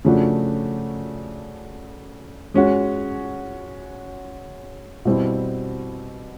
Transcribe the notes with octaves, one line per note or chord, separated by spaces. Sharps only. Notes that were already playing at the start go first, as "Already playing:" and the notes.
C#3 F3 A3 D4 F#4
G#3 C#4 F#4
B2 G3 C4 E4